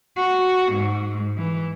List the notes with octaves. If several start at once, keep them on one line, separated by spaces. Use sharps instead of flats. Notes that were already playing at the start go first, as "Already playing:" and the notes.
F#4
G#2
E3